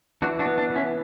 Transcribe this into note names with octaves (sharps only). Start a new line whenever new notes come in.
E3 D4 F#4
D4 F#4
B3
D4
E3
C#4 E4